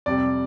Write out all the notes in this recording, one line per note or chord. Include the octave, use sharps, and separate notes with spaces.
F2 C3 G3 D5